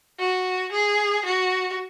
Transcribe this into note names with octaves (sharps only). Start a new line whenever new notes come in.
F#4
G#4
F#4